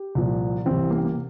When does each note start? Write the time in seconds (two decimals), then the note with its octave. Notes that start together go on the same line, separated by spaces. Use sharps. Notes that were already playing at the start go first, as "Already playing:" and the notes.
Already playing: G4
0.15 C2 A#2 F3
0.66 C2 C3 E3 C4
0.91 A#3
0.98 C4
1.05 A#3